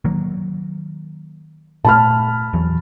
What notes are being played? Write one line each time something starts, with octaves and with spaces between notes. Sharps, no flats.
D#3 F#3 A#3
A#2 A3 A5 B5 F6
E2 E3 F#3